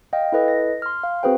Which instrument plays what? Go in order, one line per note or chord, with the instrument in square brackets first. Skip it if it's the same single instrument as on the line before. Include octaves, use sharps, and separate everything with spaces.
[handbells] D#5 F5 G5
E4 A4 B4 D#5
A#6
C6 F6
F5
C4 F#4 G#4 B4 C5 G5